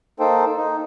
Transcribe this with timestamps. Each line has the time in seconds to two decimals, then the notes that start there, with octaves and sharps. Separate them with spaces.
0.20 A#3 D#4 A4 C5 G5
0.57 D#4